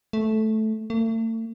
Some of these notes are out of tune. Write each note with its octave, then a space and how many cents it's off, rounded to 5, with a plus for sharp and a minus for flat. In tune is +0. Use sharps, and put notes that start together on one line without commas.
A3 -10
A3 +40